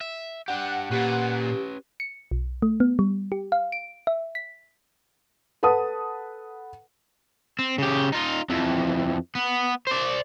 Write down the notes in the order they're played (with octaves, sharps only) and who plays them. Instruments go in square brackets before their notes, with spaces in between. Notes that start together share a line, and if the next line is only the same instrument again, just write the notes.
[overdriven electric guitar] E5
[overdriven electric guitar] D4 G4 [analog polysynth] F#5
[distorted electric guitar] A#2 [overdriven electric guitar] C#4 B4 [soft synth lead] G4
[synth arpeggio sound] C#7
B1
A3
B3
G3
G4
F5
D7
E5
B6
[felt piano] A4 B4 F#5 A5 D#6
[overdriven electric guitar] C4
C#3 G4
D#4 F4
F2 E3
B3
C5 D5